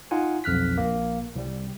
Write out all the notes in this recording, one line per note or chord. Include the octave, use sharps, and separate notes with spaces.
D#4 F4 F#5 G#5
B1 F2 F6 F#6 B6
A#1 A#3
C2 G3